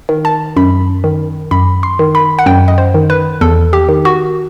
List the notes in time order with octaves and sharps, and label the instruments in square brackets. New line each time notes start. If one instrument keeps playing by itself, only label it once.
[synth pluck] D#3
A5
F#2 B5
D#3
F#2 B5
C6
D#3
B5
F#5
F#2 G5
D#5
C5
D#3
B4
E2 A4
G4
D#3
F#4